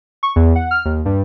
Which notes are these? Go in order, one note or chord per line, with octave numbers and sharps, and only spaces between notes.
C#6
E2
F#5
F6
D#2
G2